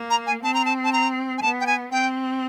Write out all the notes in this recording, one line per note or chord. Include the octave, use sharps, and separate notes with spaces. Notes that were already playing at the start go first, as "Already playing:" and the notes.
Already playing: A#3
A#5
G#5
C4 A5
A#5
A5
A5
A#5
G#5
B3 A5
G5
G#5
C4 G5